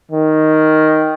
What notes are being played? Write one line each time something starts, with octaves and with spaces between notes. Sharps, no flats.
D#3